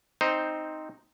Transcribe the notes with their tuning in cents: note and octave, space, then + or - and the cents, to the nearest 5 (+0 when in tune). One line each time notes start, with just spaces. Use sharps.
C4 +0 D#4 +0 C5 +0